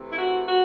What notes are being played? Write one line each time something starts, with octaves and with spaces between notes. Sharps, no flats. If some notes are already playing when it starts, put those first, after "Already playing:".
Already playing: C3 E3 A3 C4
E4
F#4
F#4